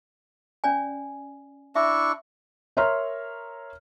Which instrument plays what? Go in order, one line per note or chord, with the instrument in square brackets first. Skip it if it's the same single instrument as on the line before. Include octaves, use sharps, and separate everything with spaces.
[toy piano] C#4 D5 G#5
[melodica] D4 E4 C#6 [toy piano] E5
[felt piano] A#4 C#5 E5 A#5 C6 F6